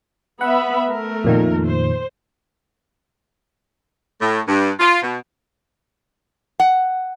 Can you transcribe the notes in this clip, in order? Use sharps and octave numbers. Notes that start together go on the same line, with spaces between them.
B3 E5 F#5 B5
A3 A#4
F2 A#2 D#3
C5
A2
G2
F4
B2
F#5